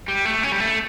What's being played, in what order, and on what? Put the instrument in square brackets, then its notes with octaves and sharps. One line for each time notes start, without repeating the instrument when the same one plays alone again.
[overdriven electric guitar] G3
A3
C#4
G3
A3